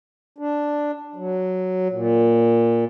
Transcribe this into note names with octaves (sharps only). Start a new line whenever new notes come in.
D4
F#3
A#2